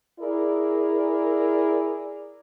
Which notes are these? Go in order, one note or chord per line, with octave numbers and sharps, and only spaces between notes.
E4 G#4 A#4 D5